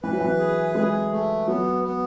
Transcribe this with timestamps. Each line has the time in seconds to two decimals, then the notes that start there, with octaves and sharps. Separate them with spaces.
0.03 E3 B4
0.12 F#3
0.21 E3
0.39 G#4
0.75 G#3 G#4
1.11 A3
1.47 F#3 B3
1.84 B3